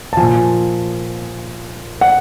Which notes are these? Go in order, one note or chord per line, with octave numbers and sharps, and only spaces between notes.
A5
A#2 F3 G#5
F#5